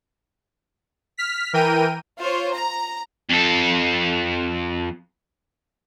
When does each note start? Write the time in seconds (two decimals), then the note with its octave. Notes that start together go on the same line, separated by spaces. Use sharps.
1.17 F6 B6
1.53 E3 A#4 G5 D#7
2.20 F4 C5 C#5
2.52 A#5
3.30 F2 A4